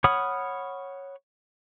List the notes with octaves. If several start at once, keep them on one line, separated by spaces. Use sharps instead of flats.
C#5 F#5 B5 D#6 F6